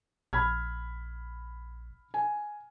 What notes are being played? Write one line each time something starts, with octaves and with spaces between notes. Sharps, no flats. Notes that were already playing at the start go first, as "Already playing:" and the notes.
A#1 B5 F6 G#6
G#5